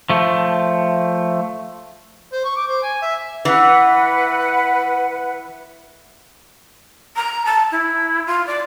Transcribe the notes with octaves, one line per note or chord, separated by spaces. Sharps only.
F3 A3
C5
C#6
D6
C5
G#5
E5
E3 B4 F#5
A#5
A5
E4
F4
D5